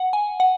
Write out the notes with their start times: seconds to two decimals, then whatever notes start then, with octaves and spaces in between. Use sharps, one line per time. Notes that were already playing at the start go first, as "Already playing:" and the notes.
Already playing: F#5
0.13 G#5
0.40 F#5